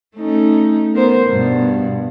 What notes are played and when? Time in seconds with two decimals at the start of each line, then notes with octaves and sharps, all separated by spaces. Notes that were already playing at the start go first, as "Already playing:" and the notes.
0.16 A3 C#4 D#4
0.93 B3 A#4 C5
1.26 G2 B2